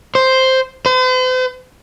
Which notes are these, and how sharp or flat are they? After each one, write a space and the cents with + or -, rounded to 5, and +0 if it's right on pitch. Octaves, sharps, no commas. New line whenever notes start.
C5 +0
C5 -45